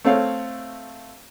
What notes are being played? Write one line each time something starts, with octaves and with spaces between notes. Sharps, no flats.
A3 C4 C#5 F5